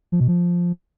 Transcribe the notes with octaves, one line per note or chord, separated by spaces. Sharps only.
F3
B2
F3